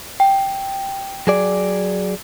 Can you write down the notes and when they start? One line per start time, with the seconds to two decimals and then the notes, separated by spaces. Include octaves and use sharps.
0.20 G5
1.27 F#3 G#4 D5